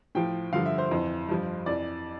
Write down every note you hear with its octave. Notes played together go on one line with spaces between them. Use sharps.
A2 F3 G5
G2 D3 F3 F5
E5
C5
F2 E3
G2 F3
F2 E3 D5